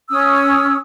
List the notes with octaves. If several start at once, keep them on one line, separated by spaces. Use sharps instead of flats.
C#4 D#6 E6